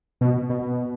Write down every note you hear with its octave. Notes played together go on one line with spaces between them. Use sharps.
B2
B2